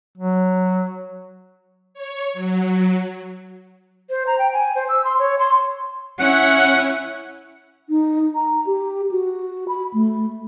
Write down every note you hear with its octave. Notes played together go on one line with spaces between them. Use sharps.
F#3
C#5
F#3
C5
A#5
G5
G#5
C5
E6
C6
C#5
C6
C#4 E4 F#5
D#4
A#5
G4
F#4
B5
A3